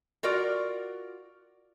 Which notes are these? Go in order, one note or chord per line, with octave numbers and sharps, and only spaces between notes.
F4 F#4 A#4 D5